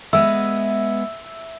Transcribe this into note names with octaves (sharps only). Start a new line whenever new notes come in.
G#3 B3 E5